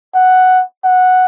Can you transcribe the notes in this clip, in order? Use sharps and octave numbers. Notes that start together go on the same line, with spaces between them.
F#5
F#5